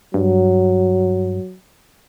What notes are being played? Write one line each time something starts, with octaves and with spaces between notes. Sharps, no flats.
G2 F#3